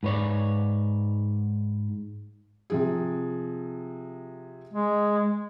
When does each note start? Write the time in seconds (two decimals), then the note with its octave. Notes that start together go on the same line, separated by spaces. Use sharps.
0.03 G#2 B4 C#5 D5
2.70 C3 F3 G#4
4.73 G#3